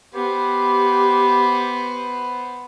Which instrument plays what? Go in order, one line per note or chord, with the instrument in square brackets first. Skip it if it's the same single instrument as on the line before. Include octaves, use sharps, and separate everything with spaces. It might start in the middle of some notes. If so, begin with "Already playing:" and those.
[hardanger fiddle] B3 C5 [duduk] G4